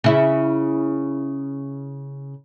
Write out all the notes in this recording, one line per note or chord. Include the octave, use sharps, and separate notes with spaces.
C#3 E4